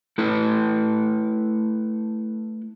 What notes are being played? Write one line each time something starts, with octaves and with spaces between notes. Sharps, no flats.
A3 E4 A4 B4